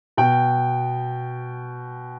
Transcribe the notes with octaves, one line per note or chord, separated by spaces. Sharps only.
B2 G5